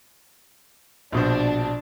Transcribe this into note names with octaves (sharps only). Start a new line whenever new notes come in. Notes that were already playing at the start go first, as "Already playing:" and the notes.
A#1 B2 D4 C5